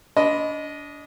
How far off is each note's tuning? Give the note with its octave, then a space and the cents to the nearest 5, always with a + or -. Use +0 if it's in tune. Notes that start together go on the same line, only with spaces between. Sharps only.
D4 -30 D#5 +0 B5 +5